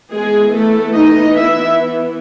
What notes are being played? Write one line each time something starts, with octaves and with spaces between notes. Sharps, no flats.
E3 G#3 B3 G#4
A3 A4
D#4 D#5
E4 E5